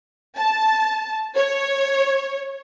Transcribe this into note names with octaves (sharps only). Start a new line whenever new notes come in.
A5
C#5